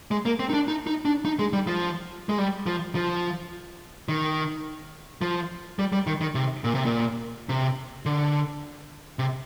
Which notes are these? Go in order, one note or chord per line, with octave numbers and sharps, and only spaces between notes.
G#3
A#3
C4
D#4
D4
D#4
D#4
D4
D#4
G#3
G3
F3
G#3
G3
F3
F3
D#3
F3
G3
G3
D#3
D#3
C3
A#2
C3
A#2
C3
D3
C3